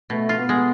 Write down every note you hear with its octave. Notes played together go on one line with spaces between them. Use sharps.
B2 A3
F4
B3
G#3